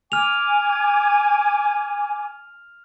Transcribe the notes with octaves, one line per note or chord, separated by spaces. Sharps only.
G#5 D6 F6 F7